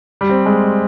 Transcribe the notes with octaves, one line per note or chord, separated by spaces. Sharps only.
G3
C4
G#3